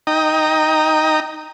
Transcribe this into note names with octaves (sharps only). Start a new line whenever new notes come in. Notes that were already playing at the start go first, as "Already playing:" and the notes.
D#4 G5 A#5 D#6